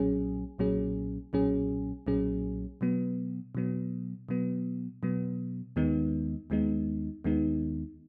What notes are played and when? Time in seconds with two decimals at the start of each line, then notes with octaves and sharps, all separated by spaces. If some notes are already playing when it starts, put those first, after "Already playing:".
Already playing: B1 A#2 F#3 C#4 G#4
0.58 B1 A#2 F#3 C#4 G#4
1.33 B1 A#2 F#3 C#4 G#4
2.07 B1 A#2 F#3 C#4 G#4
2.81 B2 F#3 B3
3.55 B2 F#3 B3
4.29 B2 F#3 B3
5.03 B2 F#3 B3
5.76 D#2 D#3 G#3 B3 D#4
6.50 D#2 D#3 G#3 B3 D#4
7.24 D#2 D#3 G#3 B3 D#4